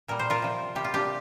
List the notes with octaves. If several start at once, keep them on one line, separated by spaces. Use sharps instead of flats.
A#2 G3 A#4
C5
F4 A#4
C3 F3
C3 G3 G4
F4
D4 G4